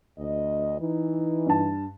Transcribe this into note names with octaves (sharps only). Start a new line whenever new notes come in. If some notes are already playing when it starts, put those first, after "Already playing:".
D2 D#5
E3 D#4
G2 A5